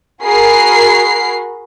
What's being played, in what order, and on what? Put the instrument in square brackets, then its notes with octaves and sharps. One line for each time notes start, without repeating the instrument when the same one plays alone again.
[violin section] F#4 G#4 A#4 B5 C7